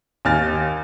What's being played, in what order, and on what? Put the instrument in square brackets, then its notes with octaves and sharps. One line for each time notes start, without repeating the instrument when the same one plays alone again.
[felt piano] D#2 G#5 F6 A6